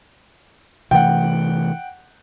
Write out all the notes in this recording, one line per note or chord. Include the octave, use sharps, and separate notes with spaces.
C3 E3 A3 F#5 G5